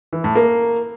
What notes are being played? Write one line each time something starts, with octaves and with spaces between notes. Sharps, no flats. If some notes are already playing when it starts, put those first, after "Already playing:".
E3
A2
A#3